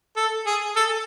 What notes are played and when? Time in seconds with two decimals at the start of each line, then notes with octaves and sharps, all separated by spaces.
0.17 A4
0.46 G#4
0.76 A4